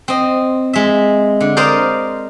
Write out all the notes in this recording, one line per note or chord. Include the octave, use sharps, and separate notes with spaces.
C4 D#5
G#3 E5
D3
A#4 C5 D5 D#5 F5